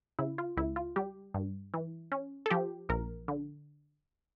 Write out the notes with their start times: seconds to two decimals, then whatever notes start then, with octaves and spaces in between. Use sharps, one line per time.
0.19 C#3 E4
0.38 F4
0.57 C#2 E4
0.76 F4
0.96 G3 G4
1.34 G2
1.74 E3
2.12 C#4
2.46 A4
2.50 F3 G4
2.89 A#1 A#4
3.28 D3